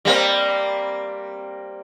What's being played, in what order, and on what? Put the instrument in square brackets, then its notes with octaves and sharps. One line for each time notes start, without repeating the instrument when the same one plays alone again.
[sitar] G3 A#3 C4